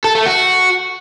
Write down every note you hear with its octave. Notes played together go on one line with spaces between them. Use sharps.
A4
A3
F#4